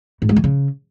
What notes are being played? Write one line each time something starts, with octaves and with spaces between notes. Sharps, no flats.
G#2
G#3
D#3
C#3